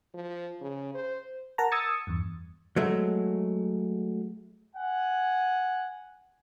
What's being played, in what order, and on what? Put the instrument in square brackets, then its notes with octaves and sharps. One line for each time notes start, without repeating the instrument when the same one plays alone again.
[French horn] F3
C#3
C5
[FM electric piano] A#4 F#5 A5 A#5
D#6 E6 G#6 A6 C#7
E2 G2
[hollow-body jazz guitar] F#3 G#3 A3
[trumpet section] F#5 G#5